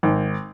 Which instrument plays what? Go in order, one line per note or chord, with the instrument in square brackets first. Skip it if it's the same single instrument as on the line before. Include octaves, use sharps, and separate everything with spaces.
[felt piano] G#1